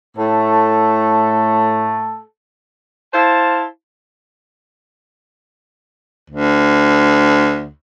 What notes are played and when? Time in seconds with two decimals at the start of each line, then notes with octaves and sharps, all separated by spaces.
0.17 A2 A3 A4
3.14 E4 C5 F5 A5
6.30 D2